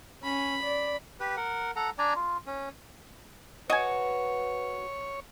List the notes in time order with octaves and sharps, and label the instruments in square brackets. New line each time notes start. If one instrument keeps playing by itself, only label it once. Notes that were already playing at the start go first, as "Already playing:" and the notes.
[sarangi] C#4 [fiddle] B5
[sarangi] D5
[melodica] G4 B4
A#4 F#5
A4 F#5 A#5
D4 D5 G#5 A#5
F4
C#4
[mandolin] F#4 [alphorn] B4 [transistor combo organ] C#5 [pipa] D#5 G#5